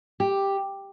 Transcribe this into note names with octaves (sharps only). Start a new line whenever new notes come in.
G4